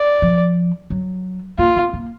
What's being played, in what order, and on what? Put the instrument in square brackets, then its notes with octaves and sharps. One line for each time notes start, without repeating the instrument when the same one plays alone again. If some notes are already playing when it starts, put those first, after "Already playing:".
Already playing: [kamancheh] D5
[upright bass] F3
F#3
[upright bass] A#3 [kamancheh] F4
[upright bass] B3
A#3